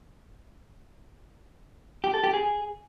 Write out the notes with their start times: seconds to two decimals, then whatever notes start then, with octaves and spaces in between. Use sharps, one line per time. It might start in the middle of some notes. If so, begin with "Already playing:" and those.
2.04 G4
2.14 A4
2.24 G4
2.33 G#4